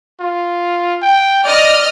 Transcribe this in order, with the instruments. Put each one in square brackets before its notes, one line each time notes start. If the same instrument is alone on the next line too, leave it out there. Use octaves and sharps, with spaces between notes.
[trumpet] F4
G5
[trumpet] D5 [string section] D#5 F6